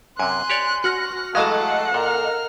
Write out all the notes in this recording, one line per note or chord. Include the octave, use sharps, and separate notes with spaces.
F#2 C3 G#5 C6 F#6
G4 C#5 D5
F#4 F6 F#6 A#6
E3 F#3 G#3 A3 A4 D#5 F5 F#5
A#2 A#4 F6